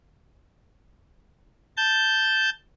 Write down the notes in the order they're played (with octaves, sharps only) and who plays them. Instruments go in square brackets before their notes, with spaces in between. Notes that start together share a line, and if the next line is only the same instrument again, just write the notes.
[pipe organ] A5 G6